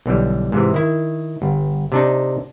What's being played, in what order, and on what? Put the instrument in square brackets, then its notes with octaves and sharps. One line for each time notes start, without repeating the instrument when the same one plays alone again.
[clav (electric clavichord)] B1 D3 E3 G3
G#2 C3 E3
D#3 E4
G1
C3 D4 D#4